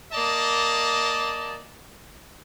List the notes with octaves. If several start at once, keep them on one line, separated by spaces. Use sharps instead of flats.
A#3 D5 D#5 A5